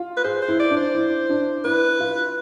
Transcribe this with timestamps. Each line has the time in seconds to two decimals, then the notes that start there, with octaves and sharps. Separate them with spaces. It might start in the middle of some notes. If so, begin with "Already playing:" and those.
Already playing: F4
0.17 B4
0.24 G#4 C5
0.42 C5
0.48 E4
0.60 D5
0.71 D4
0.77 C5
0.95 E4
1.29 D4
1.64 E4 B4
2.00 F4